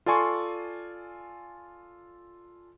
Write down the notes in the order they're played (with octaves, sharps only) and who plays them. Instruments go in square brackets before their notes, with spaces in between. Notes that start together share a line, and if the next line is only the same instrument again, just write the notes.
[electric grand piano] F4 A4 D5 G#5 C6 C#6